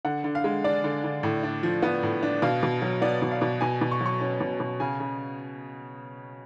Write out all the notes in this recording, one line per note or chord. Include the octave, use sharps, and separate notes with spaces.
D3 F#5
D3
F5
G#3
D4 D5
D3
D3
A2
D4
F3
B3
A2
D4
B2 F5
B2
F#3
B3 D5
B2
F5
B2
B2 G#5
B2
C#6
F#3
C#6
C#4
B2
B2
C#3 G#5
C#3